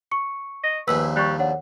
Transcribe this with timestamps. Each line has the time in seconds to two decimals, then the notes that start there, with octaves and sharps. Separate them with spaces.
0.11 C#6 C#7
0.64 D#5
0.88 A#1 D#2 A#2 B4 E6
1.16 G3 C#6 F#6
1.39 D4 C#5 F#5